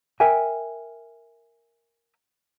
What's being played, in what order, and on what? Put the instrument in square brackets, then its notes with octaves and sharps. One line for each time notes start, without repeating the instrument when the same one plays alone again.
[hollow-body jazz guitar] A#4 E5 G5 G#5